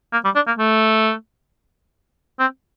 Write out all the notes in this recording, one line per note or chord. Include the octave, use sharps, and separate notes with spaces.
A#3
G3
D4
A#3
A3
C4